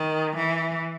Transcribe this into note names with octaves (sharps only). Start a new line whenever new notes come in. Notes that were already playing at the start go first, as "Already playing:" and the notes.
Already playing: D#3
E3